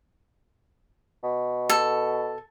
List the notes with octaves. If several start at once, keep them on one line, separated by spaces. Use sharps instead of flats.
B2
A4